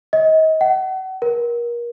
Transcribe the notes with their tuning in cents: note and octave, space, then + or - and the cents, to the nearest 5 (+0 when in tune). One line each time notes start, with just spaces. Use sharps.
D#5 +30
F#5 +35
A#4 +30